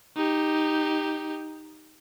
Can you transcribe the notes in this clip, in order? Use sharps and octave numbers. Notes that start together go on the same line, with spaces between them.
D#4 G4